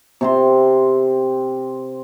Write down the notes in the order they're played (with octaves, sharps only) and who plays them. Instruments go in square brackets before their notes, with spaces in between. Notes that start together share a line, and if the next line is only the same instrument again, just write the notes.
[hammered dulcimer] C3 C4 C6